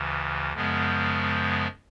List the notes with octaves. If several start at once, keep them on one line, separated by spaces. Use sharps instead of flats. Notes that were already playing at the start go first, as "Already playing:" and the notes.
Already playing: D2 C#3 E3
F#2 C#3 F3 G#3 B3